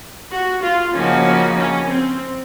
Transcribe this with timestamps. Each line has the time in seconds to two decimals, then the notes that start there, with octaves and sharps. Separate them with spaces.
0.32 F#4
0.62 F4
0.93 C#3 F3 A#3 C#4 D#4 F#4
1.25 C#4
1.56 C#4
1.87 C4